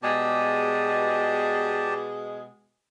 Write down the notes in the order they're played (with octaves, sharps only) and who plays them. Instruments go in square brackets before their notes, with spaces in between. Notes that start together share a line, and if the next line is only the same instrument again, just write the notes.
[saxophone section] B2 G#3 [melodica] G4 D5 A5